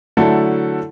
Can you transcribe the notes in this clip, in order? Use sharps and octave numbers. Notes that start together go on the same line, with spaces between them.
D3 F#3 A3 E4 A4